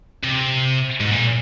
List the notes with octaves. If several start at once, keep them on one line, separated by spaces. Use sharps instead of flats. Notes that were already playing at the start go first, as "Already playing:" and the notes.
C3
G#2
A#2